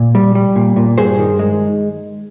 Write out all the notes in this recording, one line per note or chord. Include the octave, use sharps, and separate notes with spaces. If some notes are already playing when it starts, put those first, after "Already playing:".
Already playing: A#2
G3
G3
A#2
A#2
G2 G#4 C5
D#3
G#3